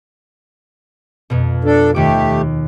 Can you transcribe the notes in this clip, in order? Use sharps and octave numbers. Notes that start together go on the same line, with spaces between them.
F2 B2
D4 A4
D#2 D#3 A3 G4 D6